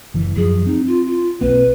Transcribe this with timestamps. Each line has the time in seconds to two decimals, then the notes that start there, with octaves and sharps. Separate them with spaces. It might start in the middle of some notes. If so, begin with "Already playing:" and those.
0.14 F#1 E3
0.36 F#2 F3 G#4
0.66 C4 D#4
0.87 F4
1.07 F4
1.41 B1 A#3 C4 B4